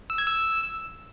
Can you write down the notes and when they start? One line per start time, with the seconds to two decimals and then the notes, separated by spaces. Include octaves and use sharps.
0.10 E6
0.18 G#6
0.27 E6